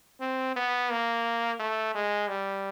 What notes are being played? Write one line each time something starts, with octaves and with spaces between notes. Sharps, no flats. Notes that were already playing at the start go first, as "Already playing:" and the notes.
C4
B3
A#3
A3
G#3
G3